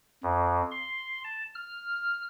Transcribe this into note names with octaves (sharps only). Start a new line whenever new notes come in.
F2
C6
A5
F6